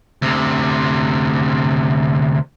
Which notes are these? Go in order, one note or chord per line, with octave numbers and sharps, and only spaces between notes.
D2 C3